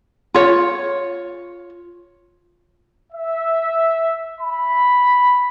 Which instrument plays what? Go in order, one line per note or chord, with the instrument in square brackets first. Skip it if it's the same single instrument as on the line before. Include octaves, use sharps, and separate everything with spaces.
[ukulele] F4 C#5
[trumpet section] E5
B5